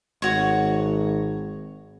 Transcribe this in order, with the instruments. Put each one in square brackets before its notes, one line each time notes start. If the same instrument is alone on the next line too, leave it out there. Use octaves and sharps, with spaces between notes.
[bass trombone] G#1 [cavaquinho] F#4 C#5